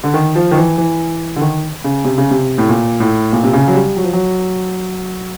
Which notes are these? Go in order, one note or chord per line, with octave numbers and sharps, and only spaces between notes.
D3
D#3
F3
D#3
E3
E3
D3
D#3
C#3
C3
C#3
C3
A2
A#2
A2
A#2
C3
C#3
F#3
G3
F#3
F3
F#3